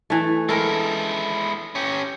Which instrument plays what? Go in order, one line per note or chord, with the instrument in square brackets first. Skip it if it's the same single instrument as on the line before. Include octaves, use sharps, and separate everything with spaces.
[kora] E3 A3
[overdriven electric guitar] G#3 E4 [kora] A4 A#4
[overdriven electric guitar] C#4 G4